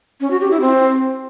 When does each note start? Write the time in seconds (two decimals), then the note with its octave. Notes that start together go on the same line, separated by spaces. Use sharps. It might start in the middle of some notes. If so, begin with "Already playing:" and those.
0.21 C#4
0.31 F#4
0.41 G4
0.51 E4
0.61 C4